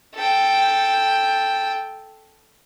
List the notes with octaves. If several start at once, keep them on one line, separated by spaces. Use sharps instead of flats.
A4 G5